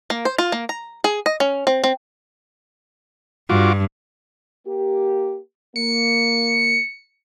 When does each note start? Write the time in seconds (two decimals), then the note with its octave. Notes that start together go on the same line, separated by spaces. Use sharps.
0.10 A#3
0.25 C5
0.38 F4
0.52 A#3
0.69 A#5
1.04 G#4
1.26 D#5
1.40 C#4
1.67 C4
1.84 C4
3.50 G2 F4 F#4 D6
4.66 A#3 G4
5.76 A#3 C#7